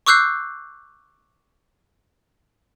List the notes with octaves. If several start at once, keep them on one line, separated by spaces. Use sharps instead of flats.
C#6 D6 E6 F#6 G6 C7